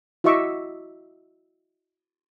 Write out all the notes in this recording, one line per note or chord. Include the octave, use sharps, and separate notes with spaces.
E4 F#4 D#5 E5 C#6 D6